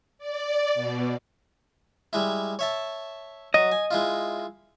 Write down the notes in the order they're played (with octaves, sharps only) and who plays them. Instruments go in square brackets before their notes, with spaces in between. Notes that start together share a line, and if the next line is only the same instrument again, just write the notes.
[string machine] D5
B2
[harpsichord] G3 G#3 E4
C#5 E5 A5
[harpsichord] F#3 [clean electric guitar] D#5
[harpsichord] G#5
G#3 E4 F4